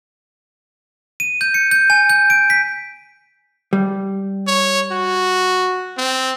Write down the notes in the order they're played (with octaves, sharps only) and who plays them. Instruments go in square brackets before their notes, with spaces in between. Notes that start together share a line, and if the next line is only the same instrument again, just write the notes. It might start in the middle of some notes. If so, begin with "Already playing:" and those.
[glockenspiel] D#7
G6
C#7
G6
G#5
G6
D7
B6
[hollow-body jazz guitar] G3
[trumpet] C#5
F#4
C4